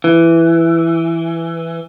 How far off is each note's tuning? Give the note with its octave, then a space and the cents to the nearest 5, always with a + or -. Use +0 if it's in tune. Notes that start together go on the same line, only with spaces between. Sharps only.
E3 +10